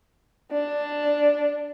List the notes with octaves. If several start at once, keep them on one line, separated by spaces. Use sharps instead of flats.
D4